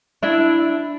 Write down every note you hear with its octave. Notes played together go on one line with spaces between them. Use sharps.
D4 E4 E5